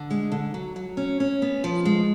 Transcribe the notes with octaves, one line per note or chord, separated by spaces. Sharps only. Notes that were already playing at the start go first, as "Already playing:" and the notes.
Already playing: D3
G#3
D3
F#3
F#3
C#4
C#4
B3
F3
G#3